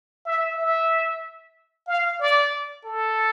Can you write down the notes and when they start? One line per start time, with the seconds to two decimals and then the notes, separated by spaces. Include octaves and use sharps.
0.25 E5
0.57 E5
1.88 F5
2.20 D5
2.85 A4